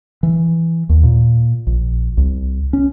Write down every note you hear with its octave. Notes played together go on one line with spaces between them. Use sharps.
E3
D#2
A#2
A#1
C2
C#4